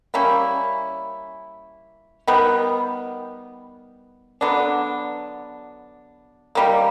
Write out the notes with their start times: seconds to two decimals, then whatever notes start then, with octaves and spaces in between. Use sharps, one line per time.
0.14 G3 A#3 C#4 E4
2.27 D#3 G3 B3
4.41 D3 F#3 B3 D4
6.55 D#3 G3 A#3